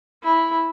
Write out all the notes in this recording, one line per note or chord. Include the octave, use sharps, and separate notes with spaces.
E4